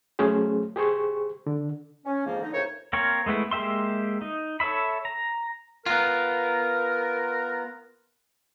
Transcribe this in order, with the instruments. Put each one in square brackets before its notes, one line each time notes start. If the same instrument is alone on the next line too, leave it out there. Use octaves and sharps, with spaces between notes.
[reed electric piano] F#3 A3 C#4 G#4 C5
G4 G#4 C5 C#6
D3
[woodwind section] C#4
F2 G#2 F3 A#3
D3 D#4
F2 A2 C#3 A#4 C5 C#5
[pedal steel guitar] A#3 C4 A#4 C#5
G#3 A3 B3 E4
G#3 A#3 G4 E5 C6
D#4
A4 C#5 E5 B5
A#5
[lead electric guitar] B3 F4 [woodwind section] A#4